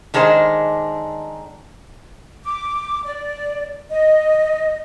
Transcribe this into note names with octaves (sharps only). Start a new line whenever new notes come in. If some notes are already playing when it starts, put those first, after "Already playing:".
D3 D#3 G#3 D4 C5
D6
D5
D#5